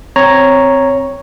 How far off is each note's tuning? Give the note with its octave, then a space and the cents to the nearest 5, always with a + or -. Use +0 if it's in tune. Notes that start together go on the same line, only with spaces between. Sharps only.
C4 +0 C#5 +0 A#5 +0